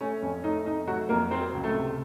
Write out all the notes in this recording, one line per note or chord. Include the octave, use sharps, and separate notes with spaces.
A3 C#4
F2 C#4
A3 D#4
F2 D#4
F#3 A3 F#4
F2 A#3 A#4
F#3 C4 C5
C#2
A3 A4
C3